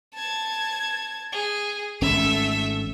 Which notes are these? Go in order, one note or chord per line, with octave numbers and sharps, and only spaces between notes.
A5 G#6
G#4
G#1 D3 A3 C#4 E5